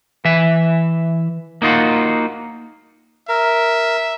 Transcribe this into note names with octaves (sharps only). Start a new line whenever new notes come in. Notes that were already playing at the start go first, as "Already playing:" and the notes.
E3 E5
A#3 D#4 F4 F#4
A#4 E5